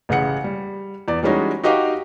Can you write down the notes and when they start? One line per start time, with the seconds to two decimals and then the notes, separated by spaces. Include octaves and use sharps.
0.09 A1 C#3 G#4 F#5 C#7
0.44 G3
1.08 E2 D5
1.23 E3 G3 G#3 C#4 D#4 F#4
1.63 D#4 F#4 G4 D#5 F5 D6